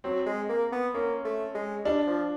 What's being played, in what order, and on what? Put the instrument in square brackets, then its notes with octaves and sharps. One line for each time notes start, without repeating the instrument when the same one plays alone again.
[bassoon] F#3 [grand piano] C4
[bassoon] G#3
A#3
B3
[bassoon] A#3 [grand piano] C#4
[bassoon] A3
G#3
[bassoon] G3 [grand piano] D4
[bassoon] F3